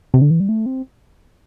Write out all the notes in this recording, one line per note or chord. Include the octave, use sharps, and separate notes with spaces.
C3
D3
E3
G3
A3
C4